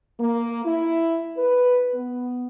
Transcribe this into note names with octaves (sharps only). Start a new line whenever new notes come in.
A#3
E4
B4
B3